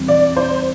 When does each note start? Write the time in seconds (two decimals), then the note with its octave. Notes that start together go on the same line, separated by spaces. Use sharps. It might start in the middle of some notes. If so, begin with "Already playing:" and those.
Already playing: E2 E3 G3 C4
0.08 D5
0.36 C5